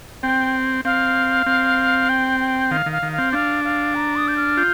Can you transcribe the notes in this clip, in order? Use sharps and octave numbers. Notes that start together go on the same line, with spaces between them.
C4 G5
C4 F5
C4
G5
G5
D#3 F5
D#3
F5
D#3
F5
C4
D4 F5
F5
A#5
D#6
G6
F6
F4 G6